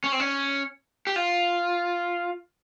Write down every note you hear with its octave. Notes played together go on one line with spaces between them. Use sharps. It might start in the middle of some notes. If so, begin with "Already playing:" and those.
C#4
C4
C#4
G4
F4